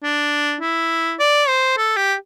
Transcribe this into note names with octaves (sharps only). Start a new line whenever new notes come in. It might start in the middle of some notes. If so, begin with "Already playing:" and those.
D4
E4
D5
C5
A4
G4